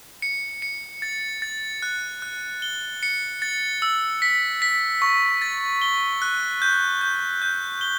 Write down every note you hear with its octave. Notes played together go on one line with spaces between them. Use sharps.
C#7
C#7
A6
A6
F#6
F#6
G7
C#7
A6
E6
B6
B6
C#6
A6
G7
F#6
G6
G6
G6
G7